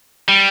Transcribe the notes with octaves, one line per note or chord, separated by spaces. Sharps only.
G3